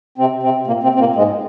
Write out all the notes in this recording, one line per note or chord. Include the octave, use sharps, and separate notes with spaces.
C3 C4
C3 C4
A#2 A#3
C3 C4
C4
A#2 A#3
G#2 G#3